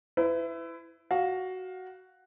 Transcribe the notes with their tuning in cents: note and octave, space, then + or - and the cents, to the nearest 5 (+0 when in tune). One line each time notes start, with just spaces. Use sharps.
E4 +10 B4 +35
F#4 +5 F5 +20